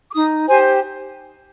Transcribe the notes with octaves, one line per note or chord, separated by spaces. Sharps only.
D6
D#4 D#6
G4 C5 G#5